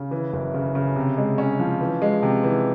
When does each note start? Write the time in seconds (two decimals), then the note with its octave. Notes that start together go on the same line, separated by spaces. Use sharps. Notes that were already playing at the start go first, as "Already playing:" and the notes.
Already playing: C#3
0.11 E3
0.33 F#1
0.54 C#3
0.75 C#3
0.96 C3
1.17 G#3
1.38 C#4
1.60 F3
1.81 E3
2.02 G#3
2.23 C3
2.44 E3